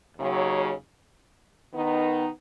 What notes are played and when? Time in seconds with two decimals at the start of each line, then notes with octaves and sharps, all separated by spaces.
0.17 D#2 C#3 F#3
1.73 D#3 B3 D#4